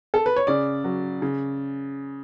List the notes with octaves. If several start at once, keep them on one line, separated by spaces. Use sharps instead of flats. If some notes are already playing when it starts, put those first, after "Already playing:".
A4
B4
C#5
C#3 D5
F#3
C#3